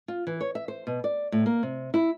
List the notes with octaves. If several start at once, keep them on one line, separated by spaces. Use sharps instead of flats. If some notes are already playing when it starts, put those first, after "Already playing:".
F4
E3
C#5
E5
C5
B2
D5
A2
A#3
C3
E4